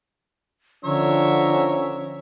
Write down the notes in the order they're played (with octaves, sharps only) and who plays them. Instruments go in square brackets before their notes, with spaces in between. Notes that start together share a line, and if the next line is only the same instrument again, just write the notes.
[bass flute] D3 [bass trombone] F3 [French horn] C#4 [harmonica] A#4 C#5 E5